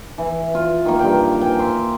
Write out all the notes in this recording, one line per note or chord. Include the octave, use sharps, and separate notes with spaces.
E3
F4
D#3 A#3
G2 G5
G5 G#5
E5 C6